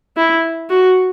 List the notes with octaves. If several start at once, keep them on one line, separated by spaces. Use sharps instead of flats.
E4
F#4